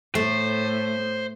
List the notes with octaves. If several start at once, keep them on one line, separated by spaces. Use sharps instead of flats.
A2 A3 C5